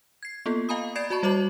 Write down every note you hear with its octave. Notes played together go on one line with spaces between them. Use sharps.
G#6 C7
A#3 B3 F4 A4
D#5 F5 G#5 A#5 B5 D#6
D5 B5 G#6 A6 C7 D7
F#4 D5 A5 B5 C#6
G3 F#4 C#5 D#5 D6 F#7